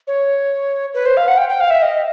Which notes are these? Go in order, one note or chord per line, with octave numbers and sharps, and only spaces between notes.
C#5
B4
C5
F5
F#5
G5
G5
F5
E5
D#5